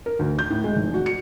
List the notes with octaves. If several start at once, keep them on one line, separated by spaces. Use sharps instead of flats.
A#4
D2
G6
A2
G#3
F1
F#4
C#7